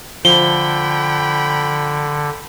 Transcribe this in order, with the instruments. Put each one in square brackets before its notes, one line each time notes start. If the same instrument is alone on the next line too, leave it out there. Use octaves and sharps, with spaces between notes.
[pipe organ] D3 [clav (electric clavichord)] F3 [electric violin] G5 B5 [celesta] G7